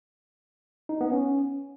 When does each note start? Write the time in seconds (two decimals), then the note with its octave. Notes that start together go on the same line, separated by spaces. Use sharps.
0.89 D#4
1.01 B3
1.12 C#4